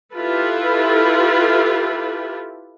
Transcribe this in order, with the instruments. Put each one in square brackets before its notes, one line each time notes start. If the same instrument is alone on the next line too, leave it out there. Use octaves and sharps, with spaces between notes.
[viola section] E4 F4 G4 A4 B4